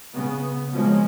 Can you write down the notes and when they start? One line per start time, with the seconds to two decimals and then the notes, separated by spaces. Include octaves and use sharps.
0.14 C#3 B3
0.74 B2 F3 G#3 A#3 C#4